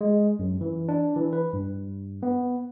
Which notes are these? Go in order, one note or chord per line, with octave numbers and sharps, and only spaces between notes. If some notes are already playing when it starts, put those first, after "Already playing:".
G#3
F#2
E3
D4
E3
B4
G2
B3